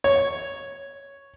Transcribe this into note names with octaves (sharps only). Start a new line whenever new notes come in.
C#5